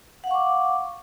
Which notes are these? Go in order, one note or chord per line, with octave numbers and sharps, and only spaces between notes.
F5 F#5 C#6 D6